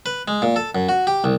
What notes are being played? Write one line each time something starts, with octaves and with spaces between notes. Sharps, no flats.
B4
G#3
A#2
A4
F#2
F#4
G4
C2